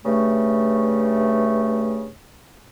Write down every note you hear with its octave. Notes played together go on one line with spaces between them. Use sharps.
G2 C#3 A3